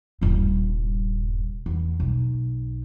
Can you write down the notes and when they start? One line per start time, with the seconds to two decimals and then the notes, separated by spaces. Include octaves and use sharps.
0.21 D#1 G2
1.66 E2
2.00 B1